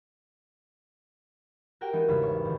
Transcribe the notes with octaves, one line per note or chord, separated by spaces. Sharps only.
F#4 G4 A#4 F#5 G5
E3 G#3 B3 D#4 F#4
G#1 E2 C#3 G3 G#3 B5
C#5 C#6
A#2 D#3